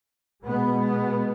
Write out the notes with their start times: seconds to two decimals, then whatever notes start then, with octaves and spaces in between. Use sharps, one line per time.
0.45 B2 G#3 B3